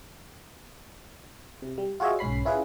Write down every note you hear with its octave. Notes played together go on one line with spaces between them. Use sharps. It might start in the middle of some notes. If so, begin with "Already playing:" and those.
C3
G3
F4 F#4 G#4 C#5 D#5 E5
B1 G#2 C#4 B5 C7
C#4 E4 F4 G#4 B4